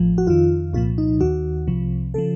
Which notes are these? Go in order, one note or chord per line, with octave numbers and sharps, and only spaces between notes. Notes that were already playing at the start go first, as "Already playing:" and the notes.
Already playing: A1 A2 F3
F#4
F2 D#3 F4
C2 A#2 F3 F4
D#4
D#2 D#3 F#4
C2 C3 F3
C#3 F3 A4